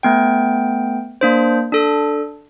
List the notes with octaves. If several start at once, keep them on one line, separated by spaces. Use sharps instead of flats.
A3 B3 G5
A#3 D4 C5
D4 A4